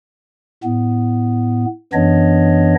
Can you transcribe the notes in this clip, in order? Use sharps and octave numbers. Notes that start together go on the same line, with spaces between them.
A2 B3
F#2 E3 B3 D4 C#5 D#5